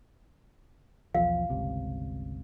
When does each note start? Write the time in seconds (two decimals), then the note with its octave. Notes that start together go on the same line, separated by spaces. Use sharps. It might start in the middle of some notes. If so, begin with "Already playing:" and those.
1.15 B1 E2 F3 F5
1.50 G1 C#2 C3